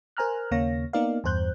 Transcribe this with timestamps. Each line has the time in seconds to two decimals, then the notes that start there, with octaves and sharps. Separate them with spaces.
0.17 A#4 C5 G#5 A#5 F6 F#6
0.51 D#2 C#3 A#3 C#5 F5 A#6
0.93 A#3 B3 D#4 A#4 D5 F5
1.24 E2 G2 C5 F#6 G6